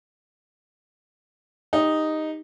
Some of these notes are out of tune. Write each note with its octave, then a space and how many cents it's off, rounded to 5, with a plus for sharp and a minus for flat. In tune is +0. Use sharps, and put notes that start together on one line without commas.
D#4 +0 G4 +25